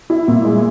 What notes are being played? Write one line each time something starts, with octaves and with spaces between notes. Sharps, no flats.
E4
A#2
G#3